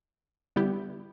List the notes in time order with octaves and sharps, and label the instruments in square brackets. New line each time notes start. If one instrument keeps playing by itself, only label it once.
[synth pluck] D3 G3 B3 E4 G4